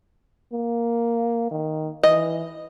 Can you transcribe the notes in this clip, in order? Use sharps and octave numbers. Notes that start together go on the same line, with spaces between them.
A#3
D#3
E3 D#5